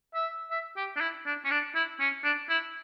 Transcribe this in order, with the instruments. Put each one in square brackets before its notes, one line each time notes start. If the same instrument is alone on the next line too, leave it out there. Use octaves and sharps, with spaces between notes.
[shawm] E5
E5
G4
D4
E4
D4
C#4
D4
E4
C#4
D4
E4